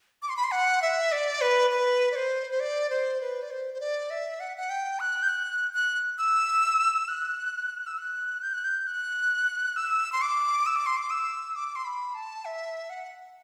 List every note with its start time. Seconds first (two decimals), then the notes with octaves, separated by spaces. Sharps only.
0.22 D6
0.29 C6
0.37 B5
0.44 C6
0.51 F#5
0.82 E5
1.12 D5
1.41 B4
1.71 B4
2.11 D5
2.16 C5
2.51 C5
2.60 D5
2.90 C5
3.21 B4
3.42 D5
3.51 C5
3.74 C5
3.80 D5
4.10 E5
4.40 F#5
4.57 F#5
4.70 G5
5.00 F#6
5.23 G6
5.28 F#6
5.74 F#6
6.18 E6
7.08 F#6
7.86 E6
7.98 F#6
8.43 G6
8.53 F#6
8.64 G6
8.87 F#6
9.76 E6
10.12 C6
10.22 D6
10.66 E6
10.76 D6
10.86 C6
10.97 D6
11.10 E6
11.56 D6
11.76 C6
11.85 B5
12.14 A5
12.45 E5
12.90 F#5